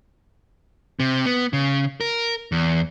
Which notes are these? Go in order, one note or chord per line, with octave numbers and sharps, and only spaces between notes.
C3
B3
C#3
A#4
E2